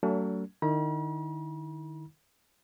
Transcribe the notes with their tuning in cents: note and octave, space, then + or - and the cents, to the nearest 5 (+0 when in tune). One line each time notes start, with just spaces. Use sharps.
F#3 +35 A3 +35 D4 -45
D#3 -30 E4 -30 B5 -45